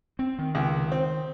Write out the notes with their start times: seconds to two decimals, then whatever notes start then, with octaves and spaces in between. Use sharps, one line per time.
0.19 C4
0.39 D#3
0.55 C#2
0.92 C4